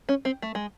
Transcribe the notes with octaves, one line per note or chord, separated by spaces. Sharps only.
C#4
C4
A3
G#3